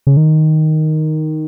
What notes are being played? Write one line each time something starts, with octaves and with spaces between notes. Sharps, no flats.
C#3
D#3